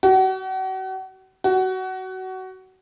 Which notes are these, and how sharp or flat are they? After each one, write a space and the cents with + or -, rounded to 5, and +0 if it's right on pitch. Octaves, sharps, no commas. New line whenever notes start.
F#4 +35
F#4 +20